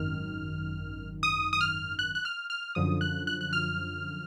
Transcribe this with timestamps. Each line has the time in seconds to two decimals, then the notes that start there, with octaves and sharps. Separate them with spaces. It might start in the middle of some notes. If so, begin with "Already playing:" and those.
Already playing: G#1 F#2 D#3 F6
1.23 D#6
1.53 D#6
1.61 F6
1.99 F#6
2.15 F#6
2.25 F6
2.50 F6
2.75 F#2 D3 F3 D#6
3.01 F#6
3.27 F#6
3.41 F#6
3.53 F6